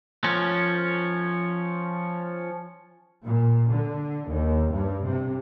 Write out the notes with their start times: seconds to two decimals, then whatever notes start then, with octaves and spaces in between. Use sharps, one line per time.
0.24 F3 C#4
3.25 A#2
3.71 D3
4.28 D#2
4.72 G2
5.05 C3